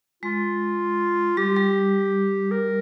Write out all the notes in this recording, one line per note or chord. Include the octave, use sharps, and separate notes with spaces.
G#3 F4
G3 G4
G3
A#4